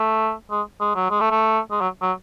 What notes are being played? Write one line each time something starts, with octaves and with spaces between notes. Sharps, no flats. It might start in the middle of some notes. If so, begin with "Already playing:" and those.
Already playing: A3
G#3
G#3
F#3
G#3
A3
A3
G#3
F#3
F#3